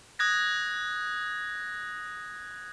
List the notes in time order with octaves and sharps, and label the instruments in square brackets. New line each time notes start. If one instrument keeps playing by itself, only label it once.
[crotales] D#6 F#6 G#6 A#6